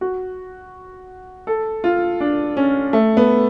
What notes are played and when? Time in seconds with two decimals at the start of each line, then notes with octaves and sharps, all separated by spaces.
0.01 F#4
1.47 A4
1.84 F4
2.20 D4
2.57 C#4
2.93 A3
3.17 B3